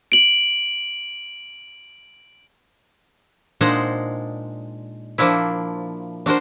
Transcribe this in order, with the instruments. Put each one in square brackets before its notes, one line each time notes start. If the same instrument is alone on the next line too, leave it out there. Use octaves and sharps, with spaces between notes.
[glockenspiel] D7 F#7
[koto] A#2 G#3 D4 D#4 C5 F#5
F3 A#3 D4 E4
D4 F#4 A#4 C5